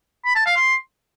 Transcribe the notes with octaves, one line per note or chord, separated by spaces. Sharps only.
B5
A5
F5
C6